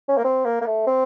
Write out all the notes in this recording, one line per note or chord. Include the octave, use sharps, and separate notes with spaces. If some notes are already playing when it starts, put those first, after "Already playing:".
C#4
A#3
C4
A#3
A#3
A3
C4